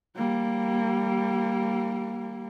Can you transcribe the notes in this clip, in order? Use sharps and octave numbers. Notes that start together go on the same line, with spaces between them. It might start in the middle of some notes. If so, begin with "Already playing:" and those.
G3 A#3